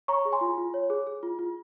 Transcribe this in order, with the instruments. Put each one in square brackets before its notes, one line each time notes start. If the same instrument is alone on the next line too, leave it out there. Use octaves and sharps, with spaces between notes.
[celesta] C#5 A#5 C#6
G#4
G#5 C6
F4
F4
C#5
G#4
G#4
F4
F4